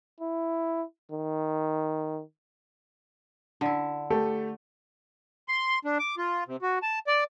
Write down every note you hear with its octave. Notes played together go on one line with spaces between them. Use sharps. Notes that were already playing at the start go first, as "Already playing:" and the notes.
E4
D#3
D3 E4
A3 G4 A4
C6
D4
D6
F4
C3
F#4
A5
D5